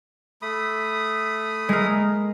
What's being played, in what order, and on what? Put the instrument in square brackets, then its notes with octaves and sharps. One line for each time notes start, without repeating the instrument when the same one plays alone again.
[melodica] A3 B5 D#6
[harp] G#3 A#4